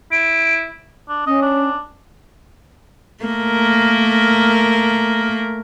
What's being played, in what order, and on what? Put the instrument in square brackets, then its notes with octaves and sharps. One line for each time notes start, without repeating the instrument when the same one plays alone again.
[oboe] E4 [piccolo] D7
[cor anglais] D4
[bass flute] C#4 [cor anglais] D#5
[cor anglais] D4
[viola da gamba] A3 A#3 A#4